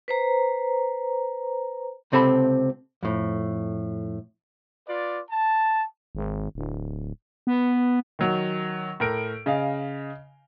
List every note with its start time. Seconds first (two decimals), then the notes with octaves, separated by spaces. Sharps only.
0.08 B4 C5 A#5
2.12 C#2 C3 C4 A4 A5 B5
3.03 F2 A2
4.87 F4 B4 D5
5.30 A5
6.15 G#1
6.55 D1
7.47 B3
8.19 D#3 F#3
9.00 A2 A#4 D7
9.46 C#3 D#5 F5